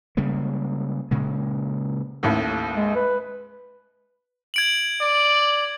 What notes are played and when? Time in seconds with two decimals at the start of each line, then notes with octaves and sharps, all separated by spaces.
0.17 C#3 G3 G#3 A#3
1.11 A#2 C#3 G#3
2.23 A1 D#2 A2
2.75 G#3
2.96 B4
4.54 G#6 D7 F#7
5.01 D5